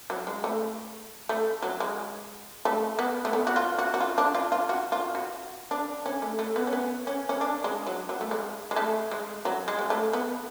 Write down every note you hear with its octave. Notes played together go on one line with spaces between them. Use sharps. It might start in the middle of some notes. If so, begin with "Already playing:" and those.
F#3
G#3
A3
A3
F#3
G#3
A3
B3
A3
B3
F#4
F4
F#4
F#4
F4
D4
F4
F4
F#4
F4
F#4
D4
C#4
A3
A3
B3
C#4
B3
C#4
C#4
D4
G#3
F#3
F#3
A3
G#3
G#3
A3
G#3
F#3
G#3
G#3
A3
B3